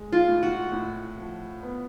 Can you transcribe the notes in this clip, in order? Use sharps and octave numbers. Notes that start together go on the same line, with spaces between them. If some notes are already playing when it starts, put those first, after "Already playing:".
Already playing: G#3
F4
A2
F#4
A2
F3
B3